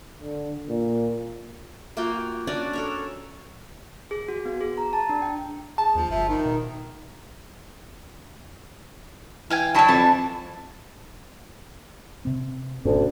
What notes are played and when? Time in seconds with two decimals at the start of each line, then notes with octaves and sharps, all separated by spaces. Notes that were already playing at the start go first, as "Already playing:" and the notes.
0.19 D3
0.69 A#2
1.97 A#3 F4 F#4 G5
2.47 C#4 D4 F#4 D5
2.73 A4 A#4 C#5
4.11 G#4
4.28 F#4
4.45 B3
4.61 G#4
4.78 A#5
4.93 A5
5.09 D4
5.22 G5
5.78 G#4 A5
5.95 D#2 F3
6.10 G1 F3 E5
6.29 D#3 D#4
6.45 B2
9.50 E3 F5 G5 G#5
9.75 F#3 E4 C#5 D#5 A5 C#6
9.88 F2 E3 A5
12.25 C3 C4
12.85 G#1 D2 B2 C#4